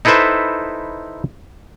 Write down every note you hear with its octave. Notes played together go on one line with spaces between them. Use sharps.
D#4 E4 A4 B4 C5 E5